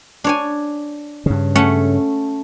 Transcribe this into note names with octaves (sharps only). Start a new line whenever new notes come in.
D4 C#5 G#5
G2 C#3
A3 C#4 F#5